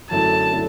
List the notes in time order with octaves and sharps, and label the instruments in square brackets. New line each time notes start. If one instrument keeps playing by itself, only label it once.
[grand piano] F#2 D3 A3 E4 [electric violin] A5
[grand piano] D3 A3 E4